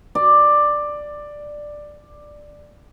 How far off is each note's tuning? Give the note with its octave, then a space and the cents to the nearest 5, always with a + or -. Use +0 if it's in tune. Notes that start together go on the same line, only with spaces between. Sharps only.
D5 +10